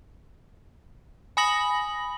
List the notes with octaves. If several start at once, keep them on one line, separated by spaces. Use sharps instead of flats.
G#5 B5 D#6 A#6 F#7